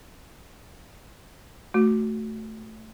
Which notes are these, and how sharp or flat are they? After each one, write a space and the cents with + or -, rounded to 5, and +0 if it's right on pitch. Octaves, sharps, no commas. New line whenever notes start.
A3 +0 F#4 +0